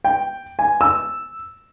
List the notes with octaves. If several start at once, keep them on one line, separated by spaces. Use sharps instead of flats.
G5
G#5
E6